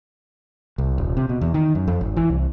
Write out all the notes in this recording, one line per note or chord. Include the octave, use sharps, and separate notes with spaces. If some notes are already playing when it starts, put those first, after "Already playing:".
C2
D#1
C3
B2
E2
D#3
F#2
F2
G#1
E3
C2